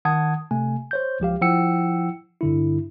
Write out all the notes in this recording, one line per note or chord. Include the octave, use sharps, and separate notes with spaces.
D#3 F#5 A5 D#6 G#6
C3 A3 G#5
C5 C#5 G6
C#2 F3 G4 F5
F3 E4 F#5 G5 E6 C#7
G2 D3 E4